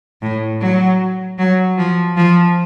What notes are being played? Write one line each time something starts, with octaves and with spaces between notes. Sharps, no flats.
A2
F#3
F#3
F3
F3